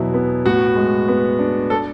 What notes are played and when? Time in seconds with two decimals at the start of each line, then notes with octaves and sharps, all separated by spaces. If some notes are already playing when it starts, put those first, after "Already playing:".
Already playing: E2 B2 F#3 E4
0.14 B3
0.46 A2 F#4
0.76 G#3
1.08 B3
1.39 D4
1.70 A4